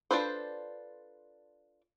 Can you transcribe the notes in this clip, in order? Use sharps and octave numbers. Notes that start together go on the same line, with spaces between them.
D4 F4 A4 B4 C5